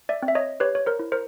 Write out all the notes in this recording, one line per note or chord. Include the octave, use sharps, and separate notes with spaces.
D5 E5
C4
E5
C#5 D#5
G4 B4 C#5
C#5
A#4 C5
E4
A#4 C5